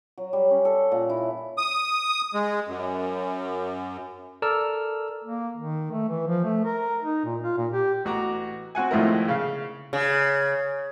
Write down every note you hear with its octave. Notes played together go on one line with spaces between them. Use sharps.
F#3
G3
C#4
A4
A#2
E4
D#6
G#3
F#2
A4 A#4 D5 E6 F6
A#3
D#3
A3
E3
F3
A3
A#4
D#4
A#2
F4
A#2
G4
A1 F#4 A#5 D6
C4 F#4 F#5 G#5
G#1 A2 F3 E4 A#4
C#3 F5
C#3